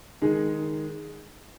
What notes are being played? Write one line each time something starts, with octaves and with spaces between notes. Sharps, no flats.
D#3 G#3 D#4 G#4